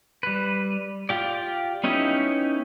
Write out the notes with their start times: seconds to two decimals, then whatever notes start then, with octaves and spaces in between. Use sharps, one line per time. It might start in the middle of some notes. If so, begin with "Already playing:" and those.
0.23 G3 B4
1.09 F4 G4 D5
1.84 B3 C#4 D#4 E4 G4